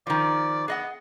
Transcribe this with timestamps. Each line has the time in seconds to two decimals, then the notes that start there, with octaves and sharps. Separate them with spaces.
0.07 D#3 F3 D5
0.68 B3 G#4 D#5 F#5